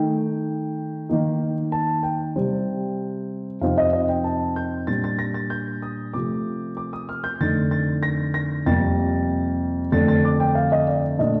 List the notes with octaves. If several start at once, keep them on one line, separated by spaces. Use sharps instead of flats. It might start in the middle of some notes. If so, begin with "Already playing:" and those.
Already playing: D#3 A3 D#4 G5
D#3 A#3 D#4
A5
G5
C3 G3 C4
F2 C3 F3 C4 D#4 F5
D#5
D#5
G5
A5
G6
A#2 G3 D4 A6
A6
A#6
A6
G6
D#6
C3 F3 A3 D6
D6
D#6
F6
G6
F2 D3 A3 D#4 A6
A6
A#6
A#6
F2 C3 G3 A#3 A6
F2 D3 A3 D4 A6
A6
D6
G5
F5
D#5
D5
A#2 A3 D4 D#5